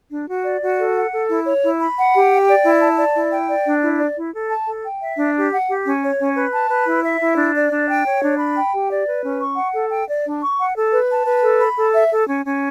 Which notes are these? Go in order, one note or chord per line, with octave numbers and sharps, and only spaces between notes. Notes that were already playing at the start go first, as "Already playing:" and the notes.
D4
F#4
D5
F#4
A4
F#5
A4
E4
C#5
E4
B5
F#5
G4
G5
D5
E4
A5
D5
E4
G5
D5
D4
E4
D5
E4
A4
A5
A4
G5
E5
D4
G4
F#5
G4
C#4
C#5
C#4
B4
A5
B4
E4
E5
E4
D4
D5
D4
G5
C#5
D4
B5
G5
G4
D5
B4
C#4
C#6
F#5
A4
G5
D5
D4
C#6
F#5
A4
B4
A5
B4
A4
B5
A4
E5
A4
C#4
C#4